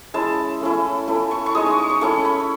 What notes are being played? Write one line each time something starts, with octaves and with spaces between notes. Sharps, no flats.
G#3 C#4 E4 A5
A3 C#4 E4
A3 C#4 E4
C#6
C#6
G#3 D#4 D#6
C#6
C#6
C#6
A3 C#4 E4 C#6
B5